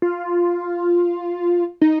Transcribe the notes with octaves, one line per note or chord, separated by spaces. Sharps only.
F4
D#4